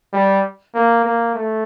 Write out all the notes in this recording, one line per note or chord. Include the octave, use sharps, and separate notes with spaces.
G3
A#3
A#3
A3